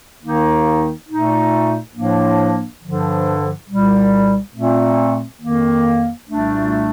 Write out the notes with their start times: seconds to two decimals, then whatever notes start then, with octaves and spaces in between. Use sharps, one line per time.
0.21 D#2 D#3 A#3 D#4
1.08 A#2 A3 D#4
1.95 A2 F3 A#3 D4
2.81 G2 D3 F3
3.69 C2 A#2 G3
4.54 A#2 A3 C4
5.40 F2 D#3 A#3
6.27 C2 A#2 A3 D4